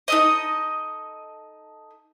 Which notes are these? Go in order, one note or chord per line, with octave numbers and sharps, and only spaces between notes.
D#4 A4 D#5